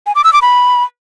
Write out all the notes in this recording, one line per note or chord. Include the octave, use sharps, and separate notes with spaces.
G#5
D6
E6
D6
B5